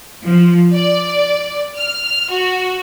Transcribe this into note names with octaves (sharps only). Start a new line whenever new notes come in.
F3
D5
F6
F#4